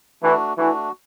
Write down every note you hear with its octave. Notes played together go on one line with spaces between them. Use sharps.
E3 A3 D4 F#4
E3 A3 D4 F#4